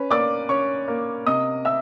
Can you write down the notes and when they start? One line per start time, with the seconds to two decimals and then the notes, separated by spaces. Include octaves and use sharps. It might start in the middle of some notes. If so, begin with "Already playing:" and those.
Already playing: C#4 B4
0.10 A#3 D5 D6
0.49 C#4 C#5 C#6
0.88 A#3
1.27 C3 D#5 D#6
1.65 E5 E6